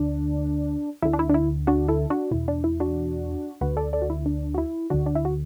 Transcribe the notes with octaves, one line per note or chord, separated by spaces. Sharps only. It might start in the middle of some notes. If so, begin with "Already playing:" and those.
Already playing: D2 D3 D4
D2 D3 E4
D4
E4
D4
E4
D4 F#4
E4 A4
D4 F#4
E2 B2 E4
D4
E4
D4 F#4
D2 D3 F#4 B4
A4 D5
A4 D5
F#4
E4
D4
F#4
E4
D2 D3 D4 F#4
D4
E4
F#4